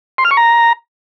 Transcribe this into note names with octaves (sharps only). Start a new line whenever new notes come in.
C6
F6
C#6
A#5